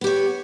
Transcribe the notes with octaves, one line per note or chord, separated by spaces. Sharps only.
B3 G4 C#5